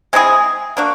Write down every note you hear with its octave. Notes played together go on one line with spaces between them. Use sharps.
G#3 C4 E4 G#4
A#3 D4 F#4